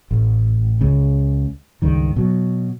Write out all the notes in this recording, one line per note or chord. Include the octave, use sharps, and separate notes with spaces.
A1
C#2 C#3
C#2 G2 D#3
B2 F#3